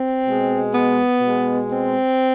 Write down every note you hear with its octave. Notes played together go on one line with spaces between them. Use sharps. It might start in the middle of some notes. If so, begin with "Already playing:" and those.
Already playing: C4
B2 G#3
B3
B2 G#3
C4